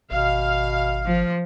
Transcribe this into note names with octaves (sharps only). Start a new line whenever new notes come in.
G#1 B2 F5
F3